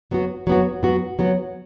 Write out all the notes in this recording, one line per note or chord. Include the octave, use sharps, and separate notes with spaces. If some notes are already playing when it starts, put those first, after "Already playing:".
F#3 B3 F#4
F#3 B3 F#4
F#3 B3 F#4
F#3 B3 F#4